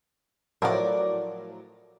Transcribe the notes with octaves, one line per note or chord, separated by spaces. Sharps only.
A2 F3 F#3 A#4 D5